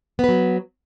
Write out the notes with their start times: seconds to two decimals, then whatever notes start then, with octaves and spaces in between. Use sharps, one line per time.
0.19 B3
0.24 B4
0.29 F#3